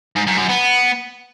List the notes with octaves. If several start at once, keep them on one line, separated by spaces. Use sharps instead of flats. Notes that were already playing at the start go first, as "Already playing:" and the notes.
G#2
F#2
F#2
B3